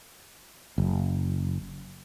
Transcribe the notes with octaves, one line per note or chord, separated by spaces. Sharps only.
F#1